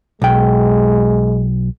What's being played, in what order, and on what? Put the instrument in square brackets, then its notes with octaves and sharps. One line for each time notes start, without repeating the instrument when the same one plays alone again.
[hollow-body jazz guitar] B1 G5 [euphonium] G#3